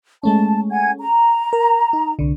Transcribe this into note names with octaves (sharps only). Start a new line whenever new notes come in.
G#3 A3 C#4 A5
F#5 G#5 G#6
A#5
A#4
D#4
C2 D3